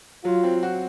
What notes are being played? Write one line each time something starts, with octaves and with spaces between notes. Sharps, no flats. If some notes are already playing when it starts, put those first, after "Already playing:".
F#3 F4
C4
F#4